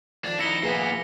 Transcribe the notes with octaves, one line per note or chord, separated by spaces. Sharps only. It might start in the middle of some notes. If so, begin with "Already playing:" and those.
F2 D#3 F3 D4
D#4 E4 A#6 C#7 G7
A#2 B3 G#4 B4 E5